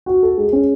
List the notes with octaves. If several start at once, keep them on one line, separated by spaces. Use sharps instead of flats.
F#4
A4
G#3
C#4